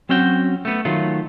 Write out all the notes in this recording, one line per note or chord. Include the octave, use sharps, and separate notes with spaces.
F#3 C4 C#4 F#4 G5
A3 B3
D#3 F#3 A3 F4